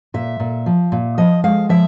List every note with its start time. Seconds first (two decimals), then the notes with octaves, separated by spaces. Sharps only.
0.14 A#2 E5
0.40 A#2
0.66 F3
0.92 A#2
1.18 F3 D#5
1.44 G#3 F5
1.69 F3 E5